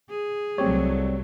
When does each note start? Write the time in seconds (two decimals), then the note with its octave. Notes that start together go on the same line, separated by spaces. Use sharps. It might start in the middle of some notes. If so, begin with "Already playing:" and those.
0.10 G#4
0.58 C2 F#3 G3 A3 C4 G4 C#5